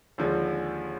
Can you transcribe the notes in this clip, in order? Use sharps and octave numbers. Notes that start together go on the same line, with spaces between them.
D#2 D3 F3 G#3